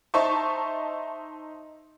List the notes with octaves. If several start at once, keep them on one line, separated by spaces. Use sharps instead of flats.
D#4 C5 E5 A5 C#6